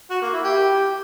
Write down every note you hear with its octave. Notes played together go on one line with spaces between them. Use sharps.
F#4
A#3
E4
G4